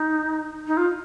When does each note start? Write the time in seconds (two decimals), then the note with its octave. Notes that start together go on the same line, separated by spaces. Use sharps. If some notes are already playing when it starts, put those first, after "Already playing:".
Already playing: D#4
0.67 D#4
0.77 F4